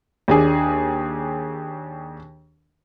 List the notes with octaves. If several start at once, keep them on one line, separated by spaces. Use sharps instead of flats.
D#2 D4 G#4